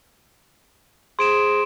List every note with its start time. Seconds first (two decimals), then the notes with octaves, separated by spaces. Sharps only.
1.19 G#4 C5 C6 D#6 D7 E7